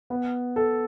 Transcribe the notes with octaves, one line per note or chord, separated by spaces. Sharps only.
B3
A4